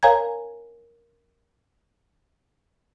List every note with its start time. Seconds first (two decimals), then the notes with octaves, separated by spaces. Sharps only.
0.03 A#4 C#5 F5 G#5 A#5 G#6